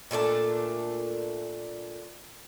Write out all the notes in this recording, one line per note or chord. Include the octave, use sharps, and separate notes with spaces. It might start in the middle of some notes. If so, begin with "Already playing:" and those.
A#2 A3 D4 A5